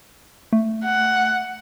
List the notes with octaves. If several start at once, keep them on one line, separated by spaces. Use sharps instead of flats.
A3
F#5